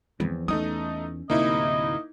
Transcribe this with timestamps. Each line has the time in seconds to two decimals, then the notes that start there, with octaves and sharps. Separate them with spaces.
0.20 E2 F3 C4
0.48 A3 C#4 D#4 D#6
1.30 D1 D2 C3 A#3 D#4 E4 D#5